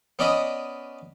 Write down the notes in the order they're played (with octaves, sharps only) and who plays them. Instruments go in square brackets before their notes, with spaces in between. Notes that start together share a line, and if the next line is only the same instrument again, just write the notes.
[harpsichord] B3 C#4 D5 D#5 B5 D#6